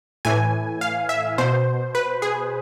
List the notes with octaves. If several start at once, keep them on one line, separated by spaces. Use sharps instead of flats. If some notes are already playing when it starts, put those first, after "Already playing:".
A2 E3 G#5
F5
E5
B2 C5
B4
G#4